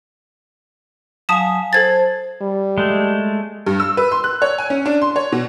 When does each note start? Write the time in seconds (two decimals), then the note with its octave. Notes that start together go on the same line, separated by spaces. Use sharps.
1.29 F#3 F5 G#5 A5 D#6 E7
1.73 A4 C5 A5 G#6 A6
2.42 G3
2.78 G#3 A3
3.67 G2
3.80 E6
3.97 B4
4.12 C6
4.24 F#6
4.42 C#5
4.58 G#5
4.70 C#4
4.86 D4
5.02 C6
5.16 C#5
5.32 B2